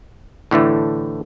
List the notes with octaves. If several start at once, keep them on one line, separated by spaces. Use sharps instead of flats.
A2 D3 E3 A3